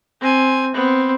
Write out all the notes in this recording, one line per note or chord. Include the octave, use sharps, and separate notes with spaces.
C4 G#5
B3 C4